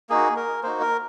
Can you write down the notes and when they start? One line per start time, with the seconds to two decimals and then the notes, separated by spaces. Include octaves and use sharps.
0.10 A#3 D#4 F#4 G#4
0.36 A#4
0.63 A#3 D#4 F#4 C5
0.81 A#4